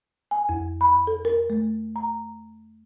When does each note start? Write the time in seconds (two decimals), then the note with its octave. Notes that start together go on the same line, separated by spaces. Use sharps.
0.31 G#5
0.49 F2
0.81 B5
1.07 A4
1.25 A#4
1.50 A3
1.96 A#5